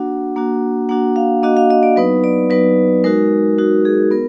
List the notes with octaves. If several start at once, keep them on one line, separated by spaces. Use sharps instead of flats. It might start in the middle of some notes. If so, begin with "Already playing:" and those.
Already playing: A#3 D4 F#4 F#5
A#3 D4 F#4
A#3 D4 F#4 F#5
F5
A#3 D4 F#4 D#5
F5
D#5
D5
F#3 B3 D#4 B4
D5
F#3 B3 D#4 B4
G#3 D#4 F#4 A#4
G#3 D#4 F#4
G#4
B3 A#4